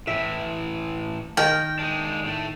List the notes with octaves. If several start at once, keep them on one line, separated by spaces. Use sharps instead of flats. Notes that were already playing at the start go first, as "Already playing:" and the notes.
A2 E3 E5
D#3 A#4 G5
G#3 D4
A2 A3